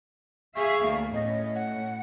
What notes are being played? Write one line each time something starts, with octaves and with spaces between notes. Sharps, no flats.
G#4 E5 F5 C#6
D2 A#3
A2 C#4 D#5
F#5